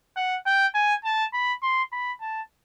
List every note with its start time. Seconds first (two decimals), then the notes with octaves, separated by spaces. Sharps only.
0.17 F#5
0.46 G5
0.75 G#5
1.05 A5
1.34 B5
1.62 C6
1.92 B5
2.21 A5